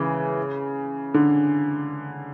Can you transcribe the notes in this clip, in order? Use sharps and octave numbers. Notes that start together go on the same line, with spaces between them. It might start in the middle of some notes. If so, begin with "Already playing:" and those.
Already playing: C#3 E3
D3